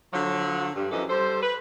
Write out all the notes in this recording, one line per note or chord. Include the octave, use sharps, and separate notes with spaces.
D3 F3 F#3
G2
F#2 E3 F3 A4 D#5
G3 A4 C5
B4